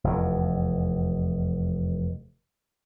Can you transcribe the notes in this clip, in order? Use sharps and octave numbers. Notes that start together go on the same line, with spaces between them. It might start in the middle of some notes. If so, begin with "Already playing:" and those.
F1 E2